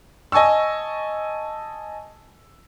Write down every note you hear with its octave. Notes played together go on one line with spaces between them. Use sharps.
D#5 G#5 A5 C#6 E6